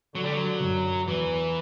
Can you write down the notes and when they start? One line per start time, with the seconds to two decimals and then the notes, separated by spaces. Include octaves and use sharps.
0.15 D3 F#3
0.24 G3
0.33 F#3
0.62 F#2
1.08 E2 E3